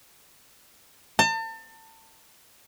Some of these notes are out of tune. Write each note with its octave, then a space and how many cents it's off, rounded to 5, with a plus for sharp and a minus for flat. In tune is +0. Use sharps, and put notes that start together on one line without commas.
A5 +35